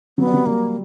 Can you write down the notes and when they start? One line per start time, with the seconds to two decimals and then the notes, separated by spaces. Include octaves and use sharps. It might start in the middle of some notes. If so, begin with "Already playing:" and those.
0.18 F#3 B3
0.26 G3
0.34 F#3
0.46 G3 A#3